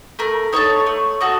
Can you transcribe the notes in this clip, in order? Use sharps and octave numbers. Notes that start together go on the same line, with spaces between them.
A3 A#4
D#4 F#4 A4 C#5
A3
D#4 F#4 A4